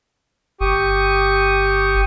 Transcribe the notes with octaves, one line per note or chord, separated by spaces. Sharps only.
G1 G4 C#6 D#6